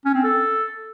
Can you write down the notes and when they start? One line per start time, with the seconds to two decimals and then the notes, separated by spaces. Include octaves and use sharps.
0.06 C#4
0.15 C4
0.24 A4